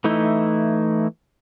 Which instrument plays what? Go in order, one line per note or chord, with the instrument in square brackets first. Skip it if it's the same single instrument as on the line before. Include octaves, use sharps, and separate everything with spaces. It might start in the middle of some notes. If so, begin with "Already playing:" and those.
[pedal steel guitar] E3 A3 D#4 E4